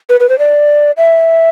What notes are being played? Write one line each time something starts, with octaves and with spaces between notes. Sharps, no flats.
B4
B4
C5
D5
E5